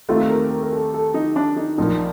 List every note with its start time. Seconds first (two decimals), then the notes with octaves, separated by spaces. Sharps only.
0.09 D#2 D#3 A3 C4 F4
0.30 A#4
0.51 A#4
0.63 A#4
0.73 A4
0.94 A4
1.14 D#4
1.36 D4
1.56 D#4
1.78 A#1 A#2 F3 A#3 D#4